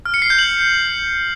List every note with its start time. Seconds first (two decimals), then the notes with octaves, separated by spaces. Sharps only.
0.06 F6
0.14 C#7
0.22 C7
0.30 G6
0.39 F#7